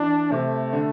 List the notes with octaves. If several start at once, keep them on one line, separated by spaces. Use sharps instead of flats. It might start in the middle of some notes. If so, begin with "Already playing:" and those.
Already playing: E3 D4
C3 A3
D3